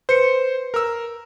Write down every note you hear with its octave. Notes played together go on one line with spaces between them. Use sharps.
B4 C5 C#7
A#4 E6